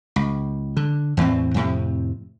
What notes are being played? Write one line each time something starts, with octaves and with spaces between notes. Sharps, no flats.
C#2
D3
E2 A2 E3 C4
F2 A2 C3